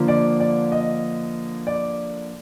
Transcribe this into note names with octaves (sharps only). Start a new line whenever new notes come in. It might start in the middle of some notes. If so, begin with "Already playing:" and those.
Already playing: D3 F3 A#3
D5
D5
D#5
D5